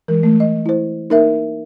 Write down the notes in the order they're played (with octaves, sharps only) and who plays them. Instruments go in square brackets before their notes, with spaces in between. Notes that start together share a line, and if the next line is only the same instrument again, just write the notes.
[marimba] E3 G#3 [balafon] A#4
[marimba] A3
[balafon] D#5
E4 C5
[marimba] A#3 [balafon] D#4 A#4 E5